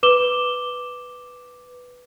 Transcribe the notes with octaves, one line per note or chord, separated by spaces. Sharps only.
B4 D6 E7 G7